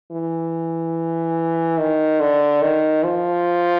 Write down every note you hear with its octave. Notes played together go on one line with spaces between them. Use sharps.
E3
D#3
D3
D#3
F3